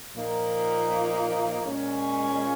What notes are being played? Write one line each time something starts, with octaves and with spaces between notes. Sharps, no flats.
A#2 F3 A#3 D#4
A#2 G#3 C#4